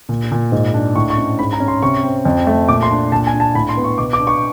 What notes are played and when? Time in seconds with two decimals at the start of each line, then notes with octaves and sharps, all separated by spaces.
0.09 A#2
0.31 A#2
0.52 G#2
0.74 D4
0.95 A2 C#6
1.10 C#6
1.17 C#4
1.39 G#2 B5
1.53 A#5
1.60 C#4
1.68 C6
1.82 C3 C#6
2.03 C4
2.25 F2
2.47 A3
2.69 A#2 D6
2.83 C6
2.91 D4
3.12 A#2 A5
3.27 G#5
3.34 D4
3.40 A5
3.54 A2 B5
3.69 C6
3.77 B3
3.84 C#6
3.98 B2 D6
4.13 D6
4.19 D4
4.27 C#6